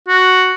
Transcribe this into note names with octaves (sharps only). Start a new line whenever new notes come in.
F#4